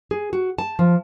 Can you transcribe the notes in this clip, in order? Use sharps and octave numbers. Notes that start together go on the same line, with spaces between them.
G#4
F#4
A5
F3